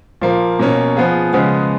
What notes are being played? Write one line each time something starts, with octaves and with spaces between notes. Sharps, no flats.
A#2 F3 A#3
B2 A#3 C#4
F3 B3 F4 G#4
C#3 F3 G#3 B3